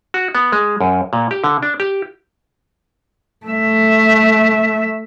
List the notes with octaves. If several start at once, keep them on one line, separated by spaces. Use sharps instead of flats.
F#4
B3
G#3
F#2
A#2
G4
D3
D4
G4
A3 E5